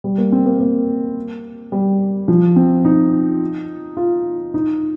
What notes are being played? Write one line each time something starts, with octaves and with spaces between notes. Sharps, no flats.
G3
A#3
C4
A#3
A#3
G3
F3
C4
D#4
F4
D#4